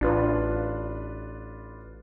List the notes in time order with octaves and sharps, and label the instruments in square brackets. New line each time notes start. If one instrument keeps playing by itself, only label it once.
[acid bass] A1 [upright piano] D4 F4 B4